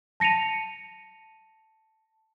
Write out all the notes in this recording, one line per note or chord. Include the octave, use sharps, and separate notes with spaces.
A5 A#6 C#7 D#7 F7